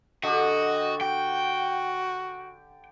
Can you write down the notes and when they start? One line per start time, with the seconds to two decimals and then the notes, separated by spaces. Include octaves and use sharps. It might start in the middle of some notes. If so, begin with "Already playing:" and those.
0.24 D3 F#4 G4 D#5
1.01 F#4 G5